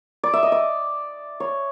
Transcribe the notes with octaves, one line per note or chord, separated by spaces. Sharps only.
D5
E5
D#5
D5
C#5